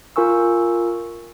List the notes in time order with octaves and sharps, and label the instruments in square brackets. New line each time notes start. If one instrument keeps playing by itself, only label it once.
[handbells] F4 A#4 G#5 C#6 E6